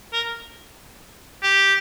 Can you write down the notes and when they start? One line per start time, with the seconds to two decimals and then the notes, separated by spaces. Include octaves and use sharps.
0.13 A#4
1.43 G4